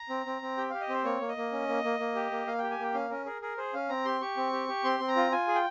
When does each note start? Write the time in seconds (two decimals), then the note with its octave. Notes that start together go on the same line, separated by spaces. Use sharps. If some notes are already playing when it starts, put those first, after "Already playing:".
Already playing: A#5
0.09 C4
0.26 C4
0.42 C4
0.57 G4 G5
0.70 G4 F5
0.81 D#5
0.89 C4 C5
1.04 A#3 C#5
1.21 A#3
1.28 D#5
1.37 A#3
1.52 C#4
1.68 A#3
1.84 A#3
1.99 A#3
2.15 G4
2.31 A#3
2.47 A#3 F5
2.59 G4 G5
2.71 G#5
2.79 A#3 G5
2.94 C#4 F5
3.10 C#4 A#4
3.26 G#4 A#4
3.42 G#4 A#4
3.57 G#4 C5
3.74 C#4 F5
3.89 C4 A#5
4.05 G4 C6
4.21 G4 C#6
4.37 C4
4.52 G4
4.68 G4
4.84 C4 C6
5.00 C4
5.08 A#5
5.16 F4
5.32 F4 G#5
5.48 G#4
5.55 G5